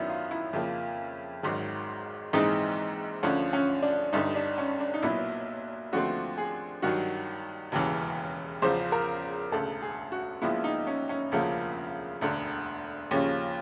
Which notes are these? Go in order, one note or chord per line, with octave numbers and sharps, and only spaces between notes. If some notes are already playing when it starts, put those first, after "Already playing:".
Already playing: F#2 D#3 F#3 B3 D4 E4
F4
E4
F2 C#3 F3 A#3
G#1 G#2 D#3 F#3
A#1 G#2 E3 G#3 C4 D#4
D2 D3 F3 C#4
C#4
D4
G1 G2 D3 D#4
D4
C#4
D4
D#4
B1 A#2 F#3 B3 E4
D#2 D3 F3 A3 C4 F#4
G#4
G2 D#3 F#3 F#4
E1 D#2 C#3 E3
E2 C#3 F3 C5
A#4
E1 D2 C#3 A4
G#4
F#4
A#1 A#2 F3 G#3 B3 E4
D#4
C#4
C#4
E1 D2 C#3 F3 A#3
E1 D2 D3
D#2 C#3 F3 C#4